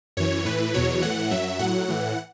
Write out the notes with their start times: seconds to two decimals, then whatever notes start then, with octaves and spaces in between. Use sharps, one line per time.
0.17 F#2 E3 C#5
0.45 A2 E3 B4
0.74 E2 B2 F#3 C#5
1.02 A2 E3 F#5
1.31 F#2 F#3 E5
1.59 A2 F#3 F#5
1.88 A2 E3